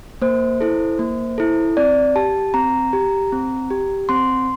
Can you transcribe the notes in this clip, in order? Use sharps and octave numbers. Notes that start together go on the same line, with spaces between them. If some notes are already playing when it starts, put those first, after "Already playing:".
A#3 C5
E4 A4
A#3
E4 A4
C4 D5
G4 A5
C4 A#5
G4
C4
G4
C4 C6